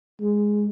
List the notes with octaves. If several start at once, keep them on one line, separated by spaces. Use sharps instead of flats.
G#3